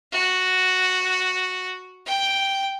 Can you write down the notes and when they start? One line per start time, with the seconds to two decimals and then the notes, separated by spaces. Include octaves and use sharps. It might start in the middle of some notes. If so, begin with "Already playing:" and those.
0.12 F#4
2.06 G5